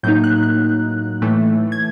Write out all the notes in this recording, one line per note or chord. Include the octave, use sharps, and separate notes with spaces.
A2 F#3 A#3 D#4 G6
F#6
F#6
A2 E3 A3
G#6